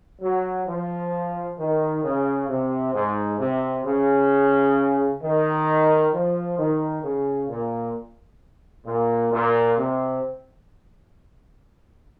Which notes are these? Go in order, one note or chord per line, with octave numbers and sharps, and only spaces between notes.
F#3
F3
D#3
C#3
C3
G#2
C3
C#3
D#3
F3
D#3
C#3
A#2
A#2
A#2
C3